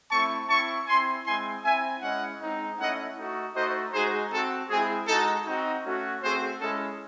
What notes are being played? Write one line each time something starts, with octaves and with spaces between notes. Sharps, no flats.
A3 C4 E4 A5 C#6
C4 E4 A5 C#6
C4 E4 G#5 C6
G#3 C4 E4 G#5 C6
C4 E4 E5 G#5
G#3 C#4 E4 D#5 F#5
G#3 C4 D#4
A3 C#4 E4 D#5 F#5
A3 D#4 F#4
A3 D#4 F#4 C5 D#5
G#3 D#4 F#4 G#4 C5
C4 F#4 A4
G#3 C4 E4 G#4
G#3 D#4 F#4 A4
C4 D#4 F#4
A3 C#4 F#4
A3 C4 F#4 G#4 C5
G#3 C#4 E4 A4